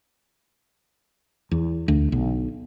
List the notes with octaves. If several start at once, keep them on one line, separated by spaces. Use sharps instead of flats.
E2
D2
B1